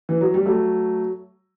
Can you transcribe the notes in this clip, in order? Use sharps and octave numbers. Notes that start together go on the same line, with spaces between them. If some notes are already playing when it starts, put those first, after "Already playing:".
E3
F#3
G3
F#3 A3